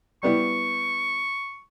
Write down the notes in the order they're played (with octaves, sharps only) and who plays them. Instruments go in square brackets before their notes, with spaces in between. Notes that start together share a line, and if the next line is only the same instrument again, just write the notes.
[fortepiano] G3 B3 E4 [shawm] C#6